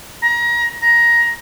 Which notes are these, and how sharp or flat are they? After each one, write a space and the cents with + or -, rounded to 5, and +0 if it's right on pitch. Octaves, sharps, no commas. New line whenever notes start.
A#5 +30
A#5 +15